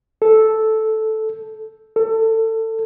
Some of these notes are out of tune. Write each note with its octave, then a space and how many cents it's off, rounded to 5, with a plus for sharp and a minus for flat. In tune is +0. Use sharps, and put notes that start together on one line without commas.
A4 -5
A4 +25